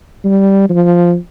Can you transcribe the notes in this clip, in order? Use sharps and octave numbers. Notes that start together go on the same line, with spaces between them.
G3
F3